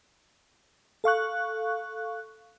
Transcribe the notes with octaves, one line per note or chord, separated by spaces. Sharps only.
A4 F5 C#6 F#6